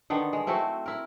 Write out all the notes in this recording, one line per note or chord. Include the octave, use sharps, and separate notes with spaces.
D3 D#3 B3
G#3
A3 C4 E4 F#4
E4 A#4